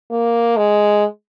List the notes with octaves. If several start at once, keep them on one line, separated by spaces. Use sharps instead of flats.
A#3
G#3